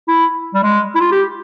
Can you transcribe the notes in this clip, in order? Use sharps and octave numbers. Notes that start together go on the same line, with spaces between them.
E4
G3
G#3
E4
F4
G4